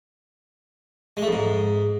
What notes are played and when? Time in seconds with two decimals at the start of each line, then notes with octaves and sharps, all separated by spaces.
1.17 G#3
1.22 A3
1.27 F2
1.33 G#2